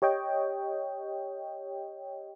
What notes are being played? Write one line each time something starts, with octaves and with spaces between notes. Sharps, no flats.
G4 C#5 D#5 G5